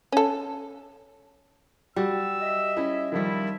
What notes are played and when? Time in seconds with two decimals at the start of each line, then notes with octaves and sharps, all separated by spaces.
0.12 C#4 A4
1.96 G3 F#4 E6
2.41 D#5 E5
2.77 C#4 E4
3.12 D#3 F3 G3 E4